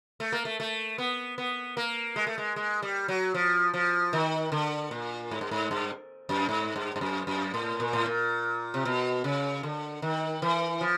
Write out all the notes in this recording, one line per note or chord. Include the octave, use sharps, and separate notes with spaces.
A3
A#3
A3
A3
B3
B3
A#3
G#3
A3
G#3
G#3
G3
F#3
F3
F3
D#3
D3
A#2
G#2
G2
G#2
G2
F#2
G#2
G2
G2
F#2
F#2
A2
A#2
A2
A#2
C3
B2
C#3
D3
D#3
E3
F3